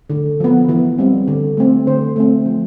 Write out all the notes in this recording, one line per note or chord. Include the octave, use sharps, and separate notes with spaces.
D3
F3 B3
E3
G3 C4
D3
A3 C4
D3 C5
A3 C4
F3